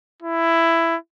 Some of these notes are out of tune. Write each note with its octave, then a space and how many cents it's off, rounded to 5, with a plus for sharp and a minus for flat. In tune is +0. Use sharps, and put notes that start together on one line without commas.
E4 +10